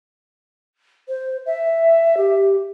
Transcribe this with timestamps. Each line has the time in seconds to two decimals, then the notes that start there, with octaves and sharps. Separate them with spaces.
1.08 C5
1.46 E5
2.17 G4